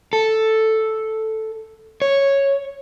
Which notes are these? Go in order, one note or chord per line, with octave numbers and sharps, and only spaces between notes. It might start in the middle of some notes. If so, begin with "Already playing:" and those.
A4
C#5